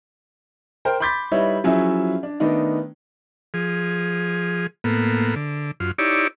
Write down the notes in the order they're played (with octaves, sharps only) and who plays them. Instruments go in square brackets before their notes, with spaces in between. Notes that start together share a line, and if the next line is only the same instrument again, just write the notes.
[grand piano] A#4 C5 G5
B5 C6 D6 G6 A6 B6
G3 D#4 E4 B4 C#5 E5
F3 F#3 C#4 E4 G#4 E5
D4
D#3 A3 B3 D4 D#4
[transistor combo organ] F3 G#4
A2 A#3 B3
D3
F#2 F4
D#4 E4 G4 C#5 D5